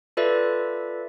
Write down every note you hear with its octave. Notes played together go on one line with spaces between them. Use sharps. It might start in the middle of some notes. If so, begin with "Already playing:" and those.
F4 A4 B4 D5 E5